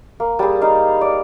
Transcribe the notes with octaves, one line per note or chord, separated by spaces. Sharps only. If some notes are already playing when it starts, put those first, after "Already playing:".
A#3
G3 G#4
D#4 F5
D5